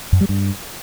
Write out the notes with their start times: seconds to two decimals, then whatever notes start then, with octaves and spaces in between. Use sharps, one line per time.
0.13 F#2
0.21 G3
0.29 G2